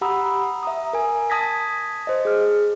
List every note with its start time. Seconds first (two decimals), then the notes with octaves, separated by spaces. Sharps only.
0.01 G4 F#5 A#5 B5 D#6 E6
0.63 E5 A#5 D#6
0.93 A#4 G#5
1.30 A5 D#6 G#6 A#6 B6
2.07 C5 D#5
2.25 G#4 F6